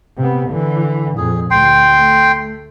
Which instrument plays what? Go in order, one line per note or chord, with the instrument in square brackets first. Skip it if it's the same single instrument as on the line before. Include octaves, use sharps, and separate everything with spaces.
[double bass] C3 B3
D3 E3
[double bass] F2 A#2 [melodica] G#4
[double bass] D2 [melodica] G5 C6
[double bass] A3